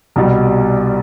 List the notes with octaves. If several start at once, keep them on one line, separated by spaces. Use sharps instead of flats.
C2 B2 G3